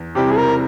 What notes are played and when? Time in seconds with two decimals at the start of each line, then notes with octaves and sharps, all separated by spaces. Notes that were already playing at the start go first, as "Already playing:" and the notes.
Already playing: E2
0.15 C3 G3 C4 E4 G4
0.31 G#4
0.37 A#4